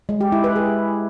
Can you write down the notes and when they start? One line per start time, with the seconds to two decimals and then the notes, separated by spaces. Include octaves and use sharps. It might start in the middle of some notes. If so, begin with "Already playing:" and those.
0.09 G#3
0.21 G4
0.32 E4
0.44 B4
0.56 G#4